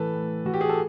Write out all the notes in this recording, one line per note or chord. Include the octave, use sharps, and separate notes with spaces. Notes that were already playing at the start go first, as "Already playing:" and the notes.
Already playing: A2 E3 A4 B4
A2
E3 F#4
G4
G#4
A4